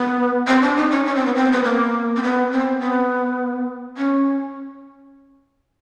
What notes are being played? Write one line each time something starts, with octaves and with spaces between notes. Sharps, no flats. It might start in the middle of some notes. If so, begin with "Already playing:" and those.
Already playing: B3
C4
D4
D#4
C#4
C#4
C4
B3
C4
B3
A#3
C4
B3
C4
B3
C#4